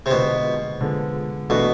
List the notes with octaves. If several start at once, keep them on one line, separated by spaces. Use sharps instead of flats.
C3
B2 D3 F3 G#3 B3
D3 F3 G#3 B3
B2 E3 A3 D4 F#4 A4